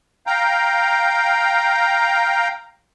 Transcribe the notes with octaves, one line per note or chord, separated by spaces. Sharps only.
F5 G5 A#5